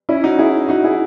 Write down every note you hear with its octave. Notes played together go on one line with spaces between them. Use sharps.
C#4 E4
D#4 F#4
E4 G#4
D#4 F#4
E4 G#4